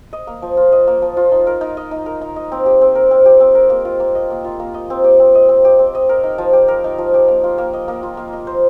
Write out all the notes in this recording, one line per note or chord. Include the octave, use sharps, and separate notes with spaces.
D#5
A#3
F3
F4
D#5
A#3
F3
F4
D#4
A#4
D#4
D#5
D#4
A#4
D#4
D#5
C4
G4
C4
A#4
C4
G4
C4
A#4
A#3
F4
A#3
D#5
A#3
F4
A#3
D#5
C4
G4
C4
D#5
C4
G4
C4
D#5
A#4
D#4
F3
G4
A#4
D#4
F3
G4
A#3
F4
A#3
D#5
A#3
F4
A#3
D#5
C5